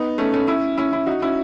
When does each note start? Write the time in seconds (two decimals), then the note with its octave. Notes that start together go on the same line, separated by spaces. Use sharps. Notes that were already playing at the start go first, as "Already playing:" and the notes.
Already playing: B3 D#4
0.18 A3 C#4
0.33 A3 C#4
0.47 C#4 E4
0.78 C#4 E4
0.92 C#4 E4
1.06 D#4 F#4
1.22 C#4 E4